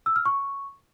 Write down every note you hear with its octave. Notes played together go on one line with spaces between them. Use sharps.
E6
F6
C#6